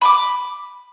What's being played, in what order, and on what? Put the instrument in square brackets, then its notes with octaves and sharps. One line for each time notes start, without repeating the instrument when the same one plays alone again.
[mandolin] B5 C#6 D6